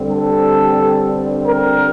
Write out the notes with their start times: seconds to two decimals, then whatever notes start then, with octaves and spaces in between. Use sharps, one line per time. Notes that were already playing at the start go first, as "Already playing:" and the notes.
Already playing: G2 D3 G3 C4
0.11 A4
1.47 A#4